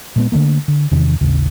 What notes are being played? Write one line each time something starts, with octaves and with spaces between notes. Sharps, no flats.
A#2 G#3 B3
D3 D#3 A3 A#3
D3
E2 C3 D#3
A1 D#2 C#3